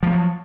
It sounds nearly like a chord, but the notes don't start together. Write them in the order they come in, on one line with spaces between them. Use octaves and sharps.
F3 A#3 F#3